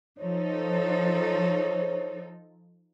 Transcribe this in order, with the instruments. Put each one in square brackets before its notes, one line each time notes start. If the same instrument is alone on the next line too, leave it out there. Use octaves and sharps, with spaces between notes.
[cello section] F3 D#4 A4 [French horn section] C5 C#5